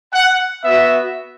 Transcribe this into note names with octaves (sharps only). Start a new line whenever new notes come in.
F#5
B3 F#4 E5